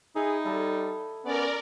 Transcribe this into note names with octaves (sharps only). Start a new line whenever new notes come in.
D#4 E4 G#4 E5
G3 E4 A4 D#5
B3 C#4 A#4 D5